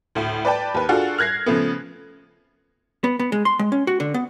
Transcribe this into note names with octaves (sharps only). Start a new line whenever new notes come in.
D2 A2
B4 D5 G5 A5
D#2 B4
D4 F4 F#4 G#4 A4
F6 F#6 G#6 A#6 C7
C#3 F3 A3 B3
B3
B3
G#3
C6
G#3
C#4
F#4
D3
B3